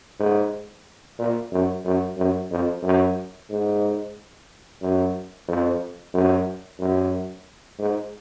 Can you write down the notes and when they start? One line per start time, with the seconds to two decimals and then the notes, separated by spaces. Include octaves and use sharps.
0.20 G#2
1.19 A#2
1.52 F#2
1.85 F#2
2.18 F#2
2.51 F2
2.84 F#2
3.50 G#2
4.82 F#2
5.48 F2
6.14 F#2
6.80 F#2
7.79 G#2